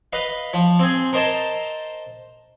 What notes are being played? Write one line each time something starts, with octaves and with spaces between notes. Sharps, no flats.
B4 D#5 F5
F3
C4 G#4
A#4 C5 D#5 A5 A#5